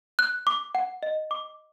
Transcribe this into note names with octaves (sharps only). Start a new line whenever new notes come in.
F#6
D6
F#5
D#5
D6